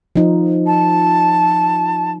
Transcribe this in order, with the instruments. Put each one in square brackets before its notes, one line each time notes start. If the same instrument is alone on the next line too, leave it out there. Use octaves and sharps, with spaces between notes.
[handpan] F3 D#4
[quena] A5